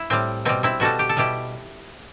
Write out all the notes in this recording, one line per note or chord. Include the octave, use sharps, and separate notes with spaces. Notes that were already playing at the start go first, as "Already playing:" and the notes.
Already playing: E4
A2 G3 C4
B2 G3 C4
C4 E4
B2 G3 F#4 A4
G4
A4
B2 G3 E4 G4